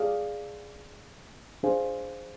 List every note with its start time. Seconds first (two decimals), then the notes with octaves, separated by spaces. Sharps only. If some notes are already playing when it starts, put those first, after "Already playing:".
Already playing: G#4 D5 F5
1.63 D4 G#4 C5 F5 G#5